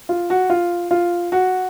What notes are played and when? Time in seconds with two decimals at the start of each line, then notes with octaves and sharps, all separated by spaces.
0.09 F4
0.30 F#4
0.50 F4
0.91 F4
1.32 F#4